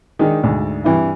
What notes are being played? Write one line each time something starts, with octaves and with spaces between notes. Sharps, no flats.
D#3 G#3 D4 D#4
D2 G#2 D5
G2 C3 E3 D4 E4